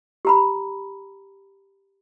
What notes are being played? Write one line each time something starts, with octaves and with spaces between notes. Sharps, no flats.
G4 A#5 B5